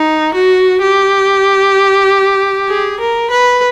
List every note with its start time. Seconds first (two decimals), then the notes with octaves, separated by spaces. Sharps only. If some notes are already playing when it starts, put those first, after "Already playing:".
Already playing: D#4
0.34 F#4
0.81 G4
2.69 G#4
3.00 A#4
3.31 B4